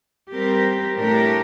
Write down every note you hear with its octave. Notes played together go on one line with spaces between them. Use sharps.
G3 C4 G4 A#4
A2 A3 D4 G4 A#4